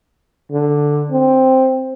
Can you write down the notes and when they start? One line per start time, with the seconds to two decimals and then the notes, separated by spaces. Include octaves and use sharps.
0.52 D3
1.12 C4